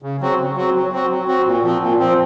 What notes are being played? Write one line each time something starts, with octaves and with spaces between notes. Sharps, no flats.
C#3
F#3 C4 F#4
C#3
F#3 C4 F#4
F#3
C4 F#4
F#3
C4 F#4
A#2
F3 C4
A#2
F3 C4